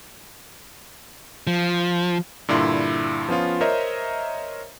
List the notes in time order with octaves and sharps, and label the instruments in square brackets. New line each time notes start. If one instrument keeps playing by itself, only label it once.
[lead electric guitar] F3
[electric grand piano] G2 A#2 D3 E4 C6
F3 B3 C#4 F4
A#4 C5 C#5 D#5 E5 A#5